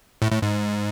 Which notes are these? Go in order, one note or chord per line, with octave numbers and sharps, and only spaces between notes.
A2
A2
G#2